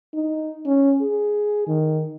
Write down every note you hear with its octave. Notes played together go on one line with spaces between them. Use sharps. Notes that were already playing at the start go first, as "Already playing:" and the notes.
D#4
C#4
G#4
D#3